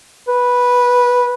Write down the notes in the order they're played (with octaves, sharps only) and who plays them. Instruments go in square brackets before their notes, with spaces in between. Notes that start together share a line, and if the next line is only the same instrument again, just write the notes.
[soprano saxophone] B4